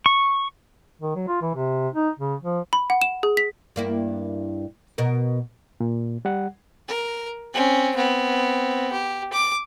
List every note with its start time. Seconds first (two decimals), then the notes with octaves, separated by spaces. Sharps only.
0.06 C#6
1.02 D#3
1.16 F#3
1.28 F4
1.42 E3
1.55 C3
1.94 D#4
2.19 C#3
2.43 F3
2.73 B5
2.90 F#5
3.02 E7
3.23 G#4
3.37 B6
3.76 G2 A#3 E4
4.98 B2 A#4
5.80 A#2
6.25 G3 F#5
6.88 A#4
7.53 C4 C#4
7.96 B3 C4
8.92 G4
9.33 D6